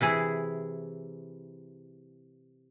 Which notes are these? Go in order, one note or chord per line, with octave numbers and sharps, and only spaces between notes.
C3 E3 E4 G#4